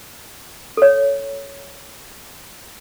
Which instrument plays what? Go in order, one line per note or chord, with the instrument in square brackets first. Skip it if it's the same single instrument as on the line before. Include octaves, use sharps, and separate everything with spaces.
[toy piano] A4 C#5